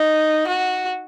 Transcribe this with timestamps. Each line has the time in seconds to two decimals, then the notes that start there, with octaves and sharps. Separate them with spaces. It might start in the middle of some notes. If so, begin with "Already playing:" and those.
Already playing: D#4
0.47 F#4